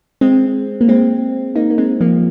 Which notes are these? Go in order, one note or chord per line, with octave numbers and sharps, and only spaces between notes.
G#3 C4
A#3
G#3 C4
A#3 D#4
A#3
G#3 C4
F3 A#3